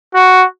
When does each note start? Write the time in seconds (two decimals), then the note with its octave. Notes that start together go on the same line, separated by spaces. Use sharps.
0.15 F#4